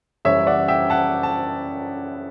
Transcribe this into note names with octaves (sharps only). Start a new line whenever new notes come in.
F#1 F#2 E3 G3 C#5 E5
D5 F#5
E5 G5
F#5 A5
A5